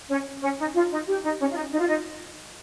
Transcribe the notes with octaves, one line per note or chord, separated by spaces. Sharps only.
C#4
C#4
D#4
F4
D#4
G4
D#4
C#4
F4
D#4
D#4
F4
D#4